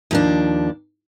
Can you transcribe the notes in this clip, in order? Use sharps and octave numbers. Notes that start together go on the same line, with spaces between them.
D#2 F3 D4